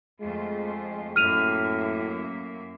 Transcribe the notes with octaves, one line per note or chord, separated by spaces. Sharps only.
F2 G#3 A3 F4
F#2 A2 A#3 E5 F6 D#7 F7